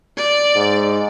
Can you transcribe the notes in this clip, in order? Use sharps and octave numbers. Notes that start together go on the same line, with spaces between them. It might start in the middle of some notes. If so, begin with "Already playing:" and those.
D5
G#2